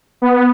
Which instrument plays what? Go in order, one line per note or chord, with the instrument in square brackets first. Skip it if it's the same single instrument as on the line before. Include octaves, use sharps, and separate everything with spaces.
[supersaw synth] B3